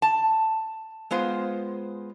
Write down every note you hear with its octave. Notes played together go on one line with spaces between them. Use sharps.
A5
G#3 B3 F4 C5